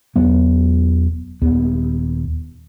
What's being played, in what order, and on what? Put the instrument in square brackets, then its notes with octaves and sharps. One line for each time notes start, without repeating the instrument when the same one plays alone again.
[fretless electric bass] E1 E2 F#3 B3
D#1 D#2 B3